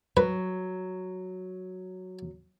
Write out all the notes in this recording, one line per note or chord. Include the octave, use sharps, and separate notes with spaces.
F#3 B4